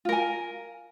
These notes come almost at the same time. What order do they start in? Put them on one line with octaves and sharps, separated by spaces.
F4 A#4 G#5